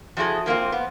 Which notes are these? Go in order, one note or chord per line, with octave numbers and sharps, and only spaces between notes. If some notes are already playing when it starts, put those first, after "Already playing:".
F3 F#3 E4 F#4 G#4 A4
F3 A#3 C4 F4
B3